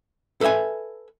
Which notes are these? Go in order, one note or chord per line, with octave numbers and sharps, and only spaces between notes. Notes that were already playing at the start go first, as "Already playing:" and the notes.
A4 B4 D#5 E5 G#5